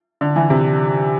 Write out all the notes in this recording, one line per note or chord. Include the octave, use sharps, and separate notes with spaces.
D3
E3
C3